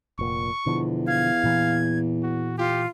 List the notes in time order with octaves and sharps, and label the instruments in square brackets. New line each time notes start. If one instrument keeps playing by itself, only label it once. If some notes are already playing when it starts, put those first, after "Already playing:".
[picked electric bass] F1 A#2 [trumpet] C#6
[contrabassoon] E2 [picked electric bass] B2 D3 F3
[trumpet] F5 [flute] G#6
[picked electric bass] A#2 E3
[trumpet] F#4
[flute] F4 [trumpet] G4